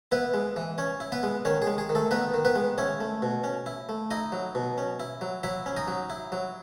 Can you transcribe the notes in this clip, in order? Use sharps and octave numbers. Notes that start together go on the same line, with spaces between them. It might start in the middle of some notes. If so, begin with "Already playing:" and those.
B3 E4 B4
G#3
E3
C#4 C#5
E4
B3 B4
G#3
D#3 C#4 C#5
G#4
G#3
G#4
D#3
A3 A4
B3 D#4 B4
D#3
B3 B4
G#3
C#4 E4 C#5
A3
B2
C#4
E4
A3
D#4 E4 D#5
F#3
B2
C#4
E4
F#3
F#3 E4 E5
C#4
D#4 D#5
F#3
E4
F#3